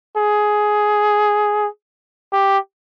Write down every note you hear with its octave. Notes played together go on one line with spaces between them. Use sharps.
G#4
G4